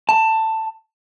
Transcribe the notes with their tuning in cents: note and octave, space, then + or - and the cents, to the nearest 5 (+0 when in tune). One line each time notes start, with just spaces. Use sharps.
A5 +15